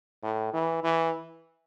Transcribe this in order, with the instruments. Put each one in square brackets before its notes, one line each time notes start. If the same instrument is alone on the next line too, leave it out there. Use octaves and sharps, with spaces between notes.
[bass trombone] A2
E3
E3